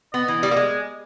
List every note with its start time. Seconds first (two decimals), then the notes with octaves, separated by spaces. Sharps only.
0.13 B3 D#5
0.28 E3
0.43 G3
0.51 A#3
0.57 G#3